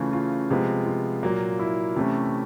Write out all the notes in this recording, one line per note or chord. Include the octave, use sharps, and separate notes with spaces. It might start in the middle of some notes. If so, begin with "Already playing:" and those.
Already playing: C#3 E3 A3 C#4 F4
F4
C3 F3 G#3 B3
F4
A#2 F#3 A#3
E4
C3 E3 A3 C#4